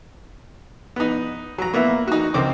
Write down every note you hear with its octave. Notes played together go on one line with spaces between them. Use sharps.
B3 D#4
F#3 A#5
A#3 B3 E4
D#4 F#4
C#2 D#3 C4 D6